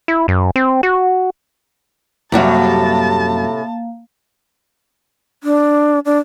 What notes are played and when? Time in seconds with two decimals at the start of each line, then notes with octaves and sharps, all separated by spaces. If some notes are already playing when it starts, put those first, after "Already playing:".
0.08 E4
0.28 F#2
0.56 C4
0.83 F#4
2.32 F#2 A2 C3 G3 A#3 F#4 F5 A5
5.44 D4
6.05 D4